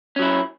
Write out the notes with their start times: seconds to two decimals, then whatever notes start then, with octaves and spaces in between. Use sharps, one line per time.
0.16 C#4
0.19 F#3
0.22 E4